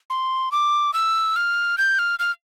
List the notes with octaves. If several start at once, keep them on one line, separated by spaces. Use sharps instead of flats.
C6
D6
E6
F6
G6
F6
F6